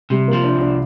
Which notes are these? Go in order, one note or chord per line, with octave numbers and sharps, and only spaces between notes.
C3 G3
F3 A#3
D4
C2
D4